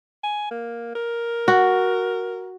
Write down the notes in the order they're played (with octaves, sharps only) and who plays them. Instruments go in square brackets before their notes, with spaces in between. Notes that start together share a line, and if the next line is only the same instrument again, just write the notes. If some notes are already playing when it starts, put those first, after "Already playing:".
[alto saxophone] G#5
A#3
A#4
[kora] F#4